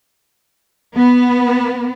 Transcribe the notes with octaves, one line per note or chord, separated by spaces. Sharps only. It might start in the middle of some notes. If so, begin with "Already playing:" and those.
B3